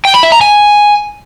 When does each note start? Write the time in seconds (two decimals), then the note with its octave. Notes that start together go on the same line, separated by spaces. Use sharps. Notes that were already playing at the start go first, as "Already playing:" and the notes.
0.05 G5
0.14 B5
0.23 E5
0.32 A#5
0.41 G#5